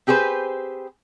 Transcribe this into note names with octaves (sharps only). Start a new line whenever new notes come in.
C4 G4 G#4 B4 C5